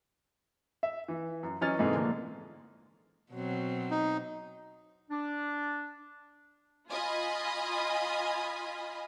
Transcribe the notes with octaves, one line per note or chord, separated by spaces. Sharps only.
E5
E3
F#2
E3 F#3 C#4 D#5 F6 A6
G#2 C3 E3 G#3 A3
A#2 D3 F3 A3 A#3
B2 F#3 C4
D#4
D4
F4 D#5 G#5 B5